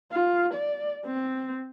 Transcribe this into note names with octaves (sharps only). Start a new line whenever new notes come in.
F4
D5
C4